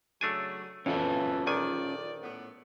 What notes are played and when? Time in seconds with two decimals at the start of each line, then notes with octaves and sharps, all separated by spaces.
0.21 C#3 F#3 A3 D4 G#5
0.86 F2 E3 C#4 F4 A4
1.47 A#1 D#3 D5 G#5
2.23 A2 B3